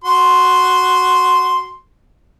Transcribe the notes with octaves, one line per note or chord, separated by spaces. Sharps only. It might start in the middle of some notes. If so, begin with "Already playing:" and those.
F#4 C6